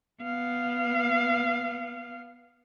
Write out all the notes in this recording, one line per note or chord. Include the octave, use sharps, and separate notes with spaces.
B3 F5